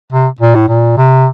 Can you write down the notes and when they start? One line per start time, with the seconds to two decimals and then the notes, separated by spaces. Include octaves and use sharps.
0.12 C3
0.41 A#2
0.55 A2
0.68 A#2
0.97 C3